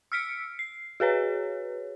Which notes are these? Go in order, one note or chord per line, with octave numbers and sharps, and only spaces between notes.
E6 F6 B6 C#7 D7
C7
F#4 G#4 B4 C#5